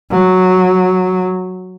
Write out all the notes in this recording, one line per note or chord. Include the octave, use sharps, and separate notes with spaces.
F#3